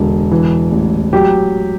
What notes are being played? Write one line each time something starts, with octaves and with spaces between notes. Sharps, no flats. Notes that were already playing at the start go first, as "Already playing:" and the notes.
Already playing: E1 D3
E3
A1
F#3 G4